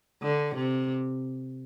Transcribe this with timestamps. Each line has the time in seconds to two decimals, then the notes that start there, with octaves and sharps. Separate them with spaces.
0.23 D3
0.56 C3